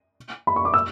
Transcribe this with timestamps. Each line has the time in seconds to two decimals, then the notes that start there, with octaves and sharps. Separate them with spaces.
0.47 B5
0.56 C#6
0.65 D6
0.74 E6